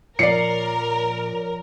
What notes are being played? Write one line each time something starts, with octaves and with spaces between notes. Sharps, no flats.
A#2 F3 F4 A#4 C#5 D5 C7 C#7